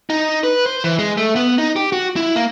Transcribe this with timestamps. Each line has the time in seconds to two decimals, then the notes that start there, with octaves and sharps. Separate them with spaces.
0.10 D#4
0.43 B4
0.66 C5
0.84 E3
0.99 G#3
1.17 A3
1.36 B3
1.58 D#4
1.76 G4
1.92 F#4
2.16 E4
2.36 A#3